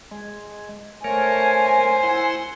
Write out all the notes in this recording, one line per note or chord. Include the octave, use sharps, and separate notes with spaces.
G#3
A3 A#4 C5 C#5 G#5
E4 F#5 C6